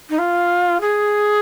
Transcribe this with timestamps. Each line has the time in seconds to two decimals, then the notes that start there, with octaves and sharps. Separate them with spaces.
0.10 D#4
0.19 F4
0.81 G#4